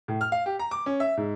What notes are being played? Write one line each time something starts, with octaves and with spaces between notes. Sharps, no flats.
A2
F6
F5
G4
A#5
D6
C#4
E5
G#2